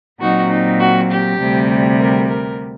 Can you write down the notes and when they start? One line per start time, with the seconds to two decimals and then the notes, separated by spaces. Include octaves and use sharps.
0.20 A#2 F#3 C4 D#4 F#4
0.49 D#4
0.79 F#4
1.10 G4
1.39 D2 C3 G3
1.98 A#4
2.28 A#4